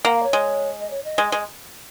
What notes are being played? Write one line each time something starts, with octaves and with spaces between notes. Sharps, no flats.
A#3 F#5
F5
C#5
G#3
D#5
C#5
D#5
G#3
G#3